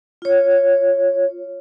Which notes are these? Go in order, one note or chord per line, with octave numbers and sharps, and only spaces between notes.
F4 C#5